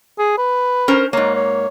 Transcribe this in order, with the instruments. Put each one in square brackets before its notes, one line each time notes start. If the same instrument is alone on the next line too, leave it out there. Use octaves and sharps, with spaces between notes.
[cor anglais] G#4
B4
[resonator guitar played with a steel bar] C#4 A#4 C5
[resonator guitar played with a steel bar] G#2 A#3 [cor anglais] C#5
[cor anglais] C#5